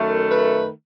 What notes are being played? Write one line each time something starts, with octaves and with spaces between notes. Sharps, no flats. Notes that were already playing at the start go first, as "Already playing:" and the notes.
Already playing: F#2 D#3 A3
B4